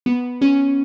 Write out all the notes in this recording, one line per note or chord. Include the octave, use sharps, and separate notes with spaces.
B3
C#4